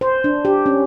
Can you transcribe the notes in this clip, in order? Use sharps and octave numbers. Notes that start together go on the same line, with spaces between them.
C5
D4
G4
C#4